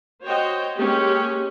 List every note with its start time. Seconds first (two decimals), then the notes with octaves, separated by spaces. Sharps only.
0.24 F#4 C5 C#5 D#5 G5
0.76 G#3 A#3 C#4 G4